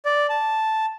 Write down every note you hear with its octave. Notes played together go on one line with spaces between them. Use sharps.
D5
A5